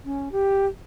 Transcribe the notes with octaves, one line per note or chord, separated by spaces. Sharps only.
C#4
G4